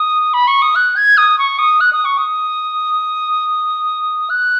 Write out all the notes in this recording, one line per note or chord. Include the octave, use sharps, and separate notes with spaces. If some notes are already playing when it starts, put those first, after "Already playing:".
Already playing: D#6
B5
C#6
D#6
F#6
G#6
D#6
C#6
D#6
F#6
D#6
C#6
D#6
F#6